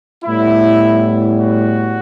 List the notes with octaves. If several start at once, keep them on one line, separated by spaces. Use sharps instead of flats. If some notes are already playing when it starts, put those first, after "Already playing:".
A2 G3 B3 E4
F#4